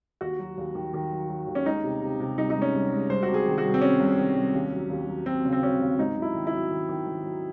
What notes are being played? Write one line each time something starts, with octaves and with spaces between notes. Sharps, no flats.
D#2 F#4
F#3
D#2
D#3
D#3
F#3
F#3
D#2
C#4
G#3 D#4
C3
C3
C3
C2 D#4
D#4
G#3
C#4
C2
G#3
C2 C5
F#4
C3
G#4
D#3
F#4
C2
C4
D#3 C#4
C2
D#3
C2
D#2
F#3
D#2
F#3
F#3 C4
C#3
C4
F#3 C#4
D#2
G#2 D#4
F#3
E4
D#3
E4
F#3
D#3
D#3
D#3
F#3